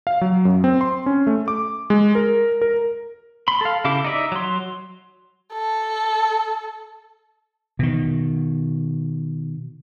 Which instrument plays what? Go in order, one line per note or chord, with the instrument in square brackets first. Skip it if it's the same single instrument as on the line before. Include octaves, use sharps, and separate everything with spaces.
[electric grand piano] F5
F#3
F#2
C4
C6
C#4
A3
D6
G#3
A#4
A#4
[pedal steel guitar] B5 C6
A4 F5
C#3 E4 G4 F5 D6
D#4 D5 E5
F#3 C6
[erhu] A4
[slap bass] B2 D#3